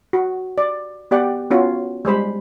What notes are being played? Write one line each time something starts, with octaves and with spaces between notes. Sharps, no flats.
F#4
D5
B3 G4 D5 F#5 G5
B3 C#4 F4 F#4 C#5
G3 G#3 C5 B5